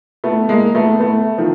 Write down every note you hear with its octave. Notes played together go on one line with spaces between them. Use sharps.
A3 B3
G#3 A#3
A3 B3
A3 B3
D#3 F3